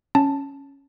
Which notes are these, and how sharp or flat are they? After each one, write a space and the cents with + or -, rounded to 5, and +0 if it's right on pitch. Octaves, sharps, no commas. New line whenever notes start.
C#4 +0 A5 +0